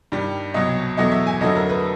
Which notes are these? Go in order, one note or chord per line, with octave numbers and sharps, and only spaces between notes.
G2 D#3 G3
C2 B2 F#3 D#5
E2 B2 F#3 A3 D#5
E5
G#5
F2 D3 F#3 A3 D#5
A#4
B4